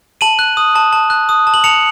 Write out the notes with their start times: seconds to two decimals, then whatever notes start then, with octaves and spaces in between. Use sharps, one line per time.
0.21 A5 D#7 F#7
0.39 F#6
0.57 D#6
0.75 A5
0.93 A5
1.10 F#6
1.29 D#6
1.47 A5
1.54 F#7
1.64 A5 C#7 F7